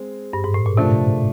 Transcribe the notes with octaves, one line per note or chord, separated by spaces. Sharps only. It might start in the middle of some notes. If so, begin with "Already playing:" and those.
Already playing: G#3 C4
G2
G#2
A2
A#2
C3 F3 A3 D4